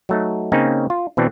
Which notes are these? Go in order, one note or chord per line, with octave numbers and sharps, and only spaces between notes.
F#3 A3 D#4
C#3 A#3 C4 C#4 D#4
F4
B2 E3 C4 D4